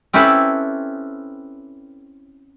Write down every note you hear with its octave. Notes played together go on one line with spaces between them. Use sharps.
C4 C#4 E4 G4 A4 B4